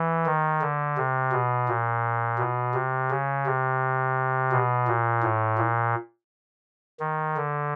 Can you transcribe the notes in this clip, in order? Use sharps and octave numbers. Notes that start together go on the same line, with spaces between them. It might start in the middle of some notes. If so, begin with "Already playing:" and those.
Already playing: E3
D#3
D3
C3
B2
A#2
B2
C3
C#3
C3
B2
A#2
A2
A#2
D#3
D3